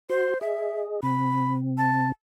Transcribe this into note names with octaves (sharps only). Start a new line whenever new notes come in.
F#4 C5 C6
G#4 D#5 E5
C3 C4 B5
A5